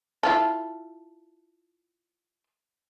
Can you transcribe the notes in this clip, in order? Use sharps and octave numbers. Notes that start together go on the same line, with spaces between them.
E4 F4 A4